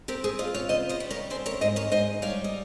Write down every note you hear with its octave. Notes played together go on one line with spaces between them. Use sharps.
C4 G4 A#4
G#4 C5
F4 C5 D#5
C#5 F5
C#3 C5 D#5
C5 D#5
G3
A#4 C#5
C4 G#4 C5
A#4 C#5
G#2 C5 D#5
A#4 C#5
G#2 C5 D#5
G3 C#5 F5
D#5